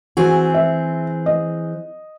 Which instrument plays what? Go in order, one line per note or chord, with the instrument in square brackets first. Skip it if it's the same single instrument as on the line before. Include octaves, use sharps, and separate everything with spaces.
[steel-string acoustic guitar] E3 C4 G#4 [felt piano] F#4
[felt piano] E5
D#5